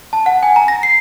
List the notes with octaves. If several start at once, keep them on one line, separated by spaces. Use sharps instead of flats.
A5
F#5
G#5
A#5
A#6
C7